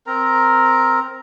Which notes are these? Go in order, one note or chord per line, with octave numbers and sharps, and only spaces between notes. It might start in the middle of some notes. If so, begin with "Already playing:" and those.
C4 A#4 A#5